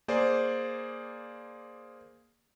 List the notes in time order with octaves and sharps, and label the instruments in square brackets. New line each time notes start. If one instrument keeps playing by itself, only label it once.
[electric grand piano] A#3 G#4 C5 D5